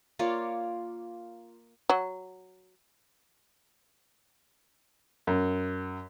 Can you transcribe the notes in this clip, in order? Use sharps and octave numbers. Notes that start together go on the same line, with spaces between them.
A#3 F4 C#5 D5
F#3
F#2